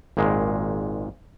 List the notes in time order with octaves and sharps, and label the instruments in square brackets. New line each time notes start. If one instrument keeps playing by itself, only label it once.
[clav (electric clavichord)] G#1 A#2 D#3 G#3